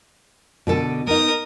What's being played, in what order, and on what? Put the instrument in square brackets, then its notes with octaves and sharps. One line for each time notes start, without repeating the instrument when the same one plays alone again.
[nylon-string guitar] B2 D3 A4
[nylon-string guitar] B3 D#4 [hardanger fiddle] A#4 D#6